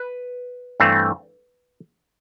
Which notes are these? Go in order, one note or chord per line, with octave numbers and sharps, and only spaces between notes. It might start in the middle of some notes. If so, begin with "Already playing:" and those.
Already playing: B4
G2 E3 A3 C4